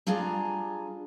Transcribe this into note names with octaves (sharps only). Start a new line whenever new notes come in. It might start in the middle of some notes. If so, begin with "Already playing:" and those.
G3 D4 F4 G#4 A#5